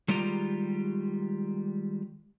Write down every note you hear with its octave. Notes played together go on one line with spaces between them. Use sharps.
D#3 G3 G#3 F4 G4 A#5